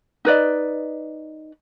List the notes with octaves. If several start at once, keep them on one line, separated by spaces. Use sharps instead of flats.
D#4 B4 D5 D#5